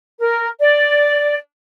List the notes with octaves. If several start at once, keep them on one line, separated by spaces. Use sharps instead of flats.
A#4
D5